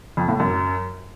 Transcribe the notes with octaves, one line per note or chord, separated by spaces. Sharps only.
F2
A2
F#2